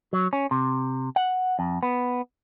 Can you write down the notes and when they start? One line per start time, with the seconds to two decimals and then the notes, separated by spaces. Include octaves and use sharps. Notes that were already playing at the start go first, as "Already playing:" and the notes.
0.13 F#3
0.33 C#4
0.51 C3
1.16 F#5
1.59 F2
1.83 B3